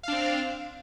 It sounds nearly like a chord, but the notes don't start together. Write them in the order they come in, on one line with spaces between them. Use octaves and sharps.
F5 D4 C4